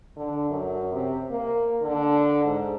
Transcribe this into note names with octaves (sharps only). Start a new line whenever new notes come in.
D3
F#2
C3
A#3
D3
G#2